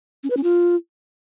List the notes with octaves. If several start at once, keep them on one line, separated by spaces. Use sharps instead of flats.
C#4
B4
C#4
F4